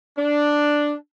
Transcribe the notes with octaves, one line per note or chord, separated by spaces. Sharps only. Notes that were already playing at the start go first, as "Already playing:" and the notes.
D4